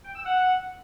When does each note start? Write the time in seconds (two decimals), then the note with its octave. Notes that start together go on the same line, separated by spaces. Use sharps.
0.04 G5
0.15 E6
0.26 F#5